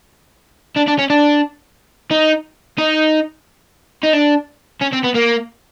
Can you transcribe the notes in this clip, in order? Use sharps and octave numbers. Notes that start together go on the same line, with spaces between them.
D4
D4
C#4
D4
D#4
D#4
D#4
D4
C#4
C4
B3
A#3